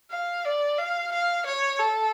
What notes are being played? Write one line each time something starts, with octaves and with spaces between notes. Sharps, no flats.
F5
D5
F5
F5
C#5
A4